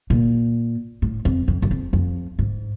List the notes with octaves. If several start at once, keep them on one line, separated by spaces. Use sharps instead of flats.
A#2
A2
F2
F2
F#2
F2
F2
G#2